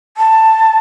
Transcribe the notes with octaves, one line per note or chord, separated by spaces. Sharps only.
A5